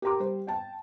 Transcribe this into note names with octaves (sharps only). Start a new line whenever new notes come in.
G4 A#4 G5 A#5 C6 D6
G3 C5
G5 A5